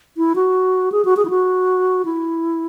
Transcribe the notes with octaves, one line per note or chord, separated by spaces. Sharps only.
E4
F#4
G#4
F#4
G#4
E4
F#4
E4